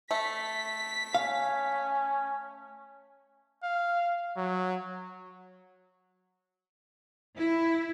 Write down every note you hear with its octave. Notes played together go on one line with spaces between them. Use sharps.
A3 B6
C#4 F5
F5
F#3
E4